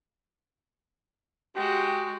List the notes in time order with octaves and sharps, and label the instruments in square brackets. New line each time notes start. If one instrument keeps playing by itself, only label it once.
[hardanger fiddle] G#3 F#4 [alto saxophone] G4